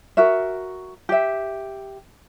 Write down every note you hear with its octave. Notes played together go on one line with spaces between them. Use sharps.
F#4 A#4 E5
G4 E5